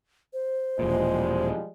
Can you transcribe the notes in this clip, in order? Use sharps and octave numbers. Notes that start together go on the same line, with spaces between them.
C5
E1 A#2 F3 G3 G#3